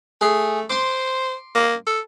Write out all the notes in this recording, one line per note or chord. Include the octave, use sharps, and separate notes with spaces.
A3 G#4
C5 C6 D6
A#3
A4